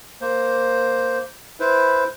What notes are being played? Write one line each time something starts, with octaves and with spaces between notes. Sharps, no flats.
A#3 C5
E4 B4 C5